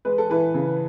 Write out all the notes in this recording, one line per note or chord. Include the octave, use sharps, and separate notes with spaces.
G#3 B4
A4
E3 B4
C#3